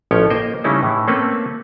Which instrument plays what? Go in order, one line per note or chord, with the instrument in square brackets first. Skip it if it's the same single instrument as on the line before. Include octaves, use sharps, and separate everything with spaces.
[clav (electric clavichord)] A1 F3 C#4 C#5 G5
A#3 C5 D#5 G5
C#3 G3 A3 C#4 D#4 E4
A2 E3
A3 A#3 C4 C#4 A4 B4